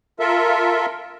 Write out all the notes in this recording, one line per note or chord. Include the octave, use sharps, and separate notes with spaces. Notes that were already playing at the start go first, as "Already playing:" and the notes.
F4 A4 A#4 E5